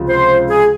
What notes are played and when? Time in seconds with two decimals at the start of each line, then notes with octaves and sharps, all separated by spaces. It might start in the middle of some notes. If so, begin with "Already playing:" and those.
Already playing: C#2 C3 F3
0.09 C5
0.49 G#4